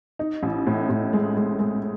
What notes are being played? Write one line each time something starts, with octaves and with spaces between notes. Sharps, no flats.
D#4
A1
A2
A2
G#3
G#3
G#3